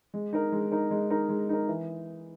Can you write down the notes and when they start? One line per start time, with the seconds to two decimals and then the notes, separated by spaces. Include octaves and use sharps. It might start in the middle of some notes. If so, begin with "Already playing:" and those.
0.14 G#3
0.33 D#4 A#4
0.52 G#3
0.72 D#4 A#4
0.91 G#3
1.10 D#4 A#4
1.29 G#3
1.49 D#4 A#4
1.68 E3